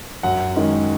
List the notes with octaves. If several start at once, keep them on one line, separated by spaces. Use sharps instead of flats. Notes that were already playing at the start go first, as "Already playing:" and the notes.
F#2 F#5
D#3 G#3 C#4